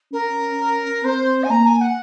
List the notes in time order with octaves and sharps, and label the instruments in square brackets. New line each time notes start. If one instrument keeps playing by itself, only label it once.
[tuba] C#4 [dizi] A#4
[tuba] C4 [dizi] C5
[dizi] G#5
[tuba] A#3 [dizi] A#5
[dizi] G#5
F#5